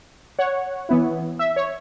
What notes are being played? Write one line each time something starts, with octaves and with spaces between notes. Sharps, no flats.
C#5 F#5
E3 B3 E4
E5
C#5